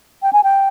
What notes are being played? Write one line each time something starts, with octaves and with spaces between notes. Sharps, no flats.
G5
G#5
G5